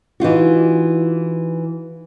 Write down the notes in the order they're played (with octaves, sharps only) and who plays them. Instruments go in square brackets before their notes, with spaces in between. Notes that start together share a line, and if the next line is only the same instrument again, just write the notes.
[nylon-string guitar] E3 D#4 F4 F#4